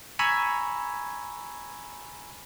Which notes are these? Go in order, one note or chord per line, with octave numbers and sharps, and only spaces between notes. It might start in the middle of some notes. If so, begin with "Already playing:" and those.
G#5 A#5 B5 C#6 E6 G#6